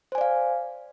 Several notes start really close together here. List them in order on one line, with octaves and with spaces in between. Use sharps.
C5 G#5 D5 F5